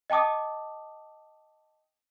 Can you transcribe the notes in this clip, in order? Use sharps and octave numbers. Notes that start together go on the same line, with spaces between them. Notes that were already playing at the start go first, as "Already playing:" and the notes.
D#5 G5 A5 D6 D#6